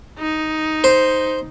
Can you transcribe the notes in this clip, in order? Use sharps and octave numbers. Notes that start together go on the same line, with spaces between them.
D#4
C5